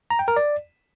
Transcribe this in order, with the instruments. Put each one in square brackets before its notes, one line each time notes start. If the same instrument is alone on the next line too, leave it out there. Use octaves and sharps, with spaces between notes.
[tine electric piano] A#5
G5
A#4
D5